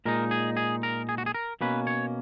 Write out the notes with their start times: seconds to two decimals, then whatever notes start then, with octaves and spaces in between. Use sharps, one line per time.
0.05 A#2 G#3 D#4 A#4
0.31 G#4
0.57 G#4
0.83 A#4
1.09 G#4
1.18 F#4
1.26 G#4
1.35 A#4
1.61 B2 A#3 C#4 B4
1.87 C#5